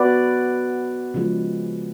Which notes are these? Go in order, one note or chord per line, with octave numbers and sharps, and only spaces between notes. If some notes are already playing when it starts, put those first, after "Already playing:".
Already playing: B3 F#4 B4 D5
C#3 F3 G#3